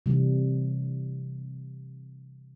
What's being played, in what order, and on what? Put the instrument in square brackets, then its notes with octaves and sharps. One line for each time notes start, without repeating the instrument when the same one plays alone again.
[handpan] C3 E3 G3